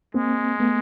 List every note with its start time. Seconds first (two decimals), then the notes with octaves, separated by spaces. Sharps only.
0.14 G#3 A#3 C4
0.60 A3 B3